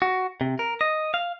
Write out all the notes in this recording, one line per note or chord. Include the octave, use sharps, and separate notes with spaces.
F#4
C3
A#4
D#5
F5